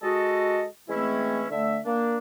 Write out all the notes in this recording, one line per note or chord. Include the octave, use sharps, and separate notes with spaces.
G#3 F#4 A4 D#5
E3 G#3 A3 C4 C#4 E4
D3 A3 E5
A#3 D4